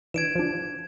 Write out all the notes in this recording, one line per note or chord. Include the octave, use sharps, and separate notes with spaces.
E3 D4 G#6 D7 E7
F3 D4